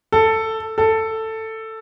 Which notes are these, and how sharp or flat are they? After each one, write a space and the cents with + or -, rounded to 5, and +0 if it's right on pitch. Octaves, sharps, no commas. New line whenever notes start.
A4 +10
A4 +10